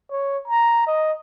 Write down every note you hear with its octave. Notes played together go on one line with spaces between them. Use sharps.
C#5
A#5
D#5